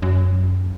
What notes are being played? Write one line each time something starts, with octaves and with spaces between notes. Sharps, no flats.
F#2